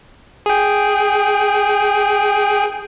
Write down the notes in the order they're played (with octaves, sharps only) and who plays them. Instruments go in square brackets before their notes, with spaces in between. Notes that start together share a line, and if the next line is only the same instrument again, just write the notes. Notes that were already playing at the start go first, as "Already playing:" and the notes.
[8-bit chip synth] G#4 G5